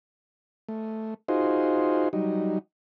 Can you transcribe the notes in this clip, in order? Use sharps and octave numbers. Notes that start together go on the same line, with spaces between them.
A3
D#4 F4 F#4 G#4 C5
F#3 G3 D#4